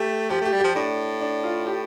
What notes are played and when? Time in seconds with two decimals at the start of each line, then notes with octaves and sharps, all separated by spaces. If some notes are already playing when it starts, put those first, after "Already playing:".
Already playing: A3 G4
0.30 F3 G4
0.41 A3 G4
0.52 G3
0.60 F3 G4
0.75 A2 D4
1.21 D4
1.44 F4
1.66 G4